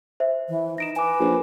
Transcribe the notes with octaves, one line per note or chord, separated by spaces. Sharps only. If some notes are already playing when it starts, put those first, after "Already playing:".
C5 E5
E3
D#4 A#6 D7 E7
B4 G#5 D6
A#1